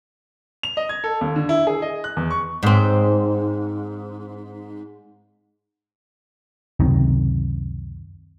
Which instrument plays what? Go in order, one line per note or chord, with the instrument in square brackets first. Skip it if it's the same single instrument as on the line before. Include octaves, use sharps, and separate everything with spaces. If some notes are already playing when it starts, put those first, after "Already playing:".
[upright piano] F7
D#5
G#6
A4
D#2
D3
E4
G#4
D#5
F#6
E2
C#6
[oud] G#2 C4
[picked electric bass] C#2 F#2 C3 D#3